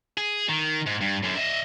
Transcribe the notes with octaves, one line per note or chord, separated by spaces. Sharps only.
G#4
D#3
G#2
G2
F#2 D3
D#5 E5